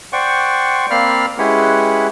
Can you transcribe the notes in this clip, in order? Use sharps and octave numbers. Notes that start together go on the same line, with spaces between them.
C5 D5 F#5 G5 C#6
A#3 C4 D5 F5 B5 F6
G#3 C#4 E4 G4 B4 F#5